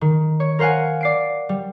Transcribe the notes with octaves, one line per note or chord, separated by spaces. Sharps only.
D#3
C#5
A#4 C5 F5 F#5 G#5
D5 C7 D7
G3